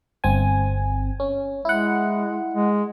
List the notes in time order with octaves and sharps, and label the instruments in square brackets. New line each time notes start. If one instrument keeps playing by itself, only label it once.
[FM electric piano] G1 C4 G#5
C#4
[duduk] G#3 [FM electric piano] E4 F#5
[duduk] G#3